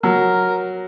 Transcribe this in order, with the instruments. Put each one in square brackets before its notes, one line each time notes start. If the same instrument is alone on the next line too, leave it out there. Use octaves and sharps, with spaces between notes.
[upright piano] F#3 [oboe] A#4